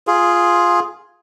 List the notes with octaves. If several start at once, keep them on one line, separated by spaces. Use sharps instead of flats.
F4 G#4